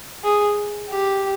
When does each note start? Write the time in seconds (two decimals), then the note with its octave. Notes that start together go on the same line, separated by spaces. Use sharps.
0.24 G#4
0.90 G4